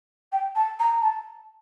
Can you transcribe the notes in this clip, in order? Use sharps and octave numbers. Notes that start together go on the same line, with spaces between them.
G5
A5
A#5
A5